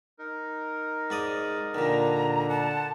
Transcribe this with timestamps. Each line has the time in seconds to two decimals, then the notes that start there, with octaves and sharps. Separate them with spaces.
0.19 D#4 A#4
1.10 G#2 D5 D#6
1.75 D#2 A#2 D3 A#5
2.49 F#5 A5